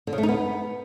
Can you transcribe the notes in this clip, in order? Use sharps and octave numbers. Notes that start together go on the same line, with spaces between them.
D3
C#3
A3
D#4
B3